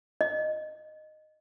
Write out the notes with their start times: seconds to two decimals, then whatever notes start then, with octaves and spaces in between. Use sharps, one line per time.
0.21 D#5